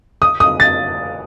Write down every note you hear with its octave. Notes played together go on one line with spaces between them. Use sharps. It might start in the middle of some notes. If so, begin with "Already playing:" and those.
D#6
D#6
A6